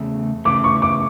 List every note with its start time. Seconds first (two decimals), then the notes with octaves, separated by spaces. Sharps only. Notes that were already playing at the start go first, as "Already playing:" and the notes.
Already playing: E2 C#3 A3
0.45 E2 C#3 E3 A3 D6
0.64 C#6
0.82 D6